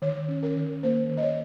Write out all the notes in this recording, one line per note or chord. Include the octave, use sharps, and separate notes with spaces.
D#3 C#5
C#4
A#4
D#3
A#3 C5
D#3
D#5
C#5